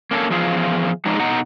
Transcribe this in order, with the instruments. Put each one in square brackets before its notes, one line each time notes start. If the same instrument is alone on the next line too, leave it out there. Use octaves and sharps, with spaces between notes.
[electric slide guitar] A#3 C#4 D4 A4
E2 F3 F4 G#4 F5
F3 F#3 G#3 D4 D#4
B2 D#4 F#5 A#5